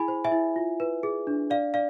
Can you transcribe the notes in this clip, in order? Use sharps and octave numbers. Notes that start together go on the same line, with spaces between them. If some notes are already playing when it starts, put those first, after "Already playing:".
Already playing: E4 G#4 G#5 B5
C5
E5 G#5
E4
F4
B4
G#4
D4
D5 F5
D5 F5